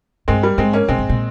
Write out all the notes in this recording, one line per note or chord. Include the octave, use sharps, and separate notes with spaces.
G2 G#3 C4
G3 A#3
G#2 G#3 C4
A#3 C#4
A#2 G#3 C4
G#2
A#2